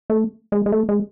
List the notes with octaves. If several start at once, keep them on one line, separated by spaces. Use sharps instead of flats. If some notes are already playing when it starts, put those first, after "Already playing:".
A3
G#3
G#3
A3
G#3